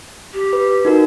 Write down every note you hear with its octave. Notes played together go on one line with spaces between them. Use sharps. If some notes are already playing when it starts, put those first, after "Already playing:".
G4
B4
D#4 F#4 A#4